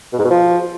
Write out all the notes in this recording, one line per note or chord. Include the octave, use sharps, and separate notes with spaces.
B2
G#2
B2
F3